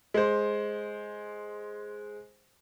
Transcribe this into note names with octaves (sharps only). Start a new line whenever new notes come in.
G#3 C5